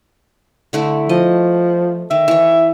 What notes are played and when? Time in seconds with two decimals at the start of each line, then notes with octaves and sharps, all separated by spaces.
0.73 D3 A3 E4
1.09 F3 D#5
2.11 D#3 E5
2.28 E3 C#5